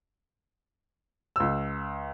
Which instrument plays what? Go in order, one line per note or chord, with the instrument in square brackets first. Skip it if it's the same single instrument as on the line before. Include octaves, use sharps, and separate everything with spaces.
[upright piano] C#2 E6